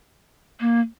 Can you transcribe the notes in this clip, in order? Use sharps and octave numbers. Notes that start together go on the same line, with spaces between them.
A#3